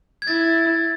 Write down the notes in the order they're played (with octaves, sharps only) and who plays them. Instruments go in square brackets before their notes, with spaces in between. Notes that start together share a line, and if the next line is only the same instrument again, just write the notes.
[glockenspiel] G#6
[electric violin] E4 [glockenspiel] A6